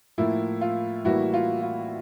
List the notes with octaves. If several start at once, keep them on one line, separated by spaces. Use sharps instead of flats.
A2 F3 A#3 E4
F4
A2 E3 G3 A#3 E4 F#4
F4
F4